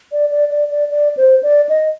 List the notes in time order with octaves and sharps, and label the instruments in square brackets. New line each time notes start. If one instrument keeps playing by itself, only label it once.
[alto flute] D5
D5
D5
D5
D5
C5
D5
D#5